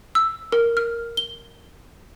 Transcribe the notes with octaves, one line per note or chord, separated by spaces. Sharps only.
E6
A#4
F6
G7